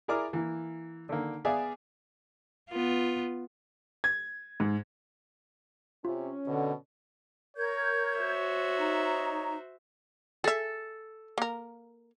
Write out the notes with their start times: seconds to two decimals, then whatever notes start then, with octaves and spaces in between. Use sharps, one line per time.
0.08 E4 G#4 A#4 D5 A#5 D6
0.33 E3 A#3
1.09 D3 D#3 A#3
1.45 B3 G#4 D5 E5 F5 G#5
2.70 B3 F4
4.04 G#6
4.60 G#2
6.05 C3 C#4 F4
6.47 B2 D3
7.57 A#4 C#5 G6 G#6
8.17 F#4 C5 E5
8.78 D#4 A#5
10.44 G#4 A4 E5
11.38 A#3 A#4